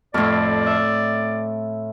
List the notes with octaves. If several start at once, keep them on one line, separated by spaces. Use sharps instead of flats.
F2 A2 D5
E5